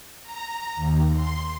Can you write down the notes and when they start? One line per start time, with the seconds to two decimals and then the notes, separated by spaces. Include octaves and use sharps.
0.22 A#5
0.75 D#2
1.12 C6